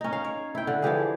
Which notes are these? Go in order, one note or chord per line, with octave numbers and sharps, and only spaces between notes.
C#4 D#4
F5
C#5
E4 G5
D3
E3 F3 G4 G#4